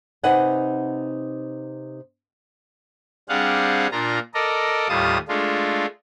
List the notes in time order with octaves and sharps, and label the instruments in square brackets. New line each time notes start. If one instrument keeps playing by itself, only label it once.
[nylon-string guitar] C3 D#4 B4 D#5 F#5 G#5
[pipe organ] G3 C4 D4 G#4 F5 F#5
A#2 D4 F4 A#5
A4 A#4 D5 D#5
D#2 A2 G3 F4 A5 D#6
G#3 A3 D4 F4